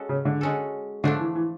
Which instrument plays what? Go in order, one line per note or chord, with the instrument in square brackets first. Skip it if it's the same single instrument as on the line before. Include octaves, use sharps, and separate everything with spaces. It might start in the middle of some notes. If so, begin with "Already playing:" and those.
Already playing: [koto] G#3 C#4 F#4 A4
[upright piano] C#3
D3
[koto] G#3 C#4 F#4 A4
[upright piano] D3 [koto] F3 A3 D4
[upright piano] E3
E3